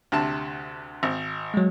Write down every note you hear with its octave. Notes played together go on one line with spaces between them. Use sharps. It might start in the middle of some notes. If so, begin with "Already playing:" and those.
D2 C3 A5
G#1
F#3 G#3